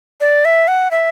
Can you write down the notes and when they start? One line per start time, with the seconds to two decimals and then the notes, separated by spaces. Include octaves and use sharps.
0.21 D5
0.45 E5
0.68 F#5
0.91 E5